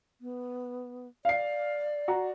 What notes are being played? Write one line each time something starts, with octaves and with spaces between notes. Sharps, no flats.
B3
D5 F5 C7
F#4 A#5